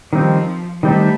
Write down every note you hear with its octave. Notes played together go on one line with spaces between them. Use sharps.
D#3 F3 G3 C4 D#4
D#3 G3 A3 C4 D#4